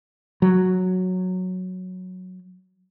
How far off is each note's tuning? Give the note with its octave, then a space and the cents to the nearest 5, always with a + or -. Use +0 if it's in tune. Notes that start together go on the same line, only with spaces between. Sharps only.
F#3 -5